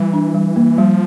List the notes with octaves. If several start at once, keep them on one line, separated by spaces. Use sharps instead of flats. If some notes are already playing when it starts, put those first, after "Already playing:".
Already playing: E3 G3
D4
G3
A#3
F3 G3